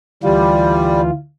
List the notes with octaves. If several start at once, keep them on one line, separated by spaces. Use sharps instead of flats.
D2 E3 G3 F4